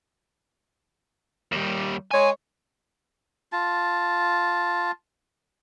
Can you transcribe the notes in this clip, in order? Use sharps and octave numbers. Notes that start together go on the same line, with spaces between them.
D#2 G3
G#3 C#5 G#5
F4 A5